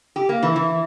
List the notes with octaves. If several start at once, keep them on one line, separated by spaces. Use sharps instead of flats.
G4
A#3
E3
E3